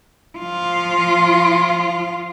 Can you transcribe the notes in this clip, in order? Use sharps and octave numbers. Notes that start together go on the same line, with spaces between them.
F3 F4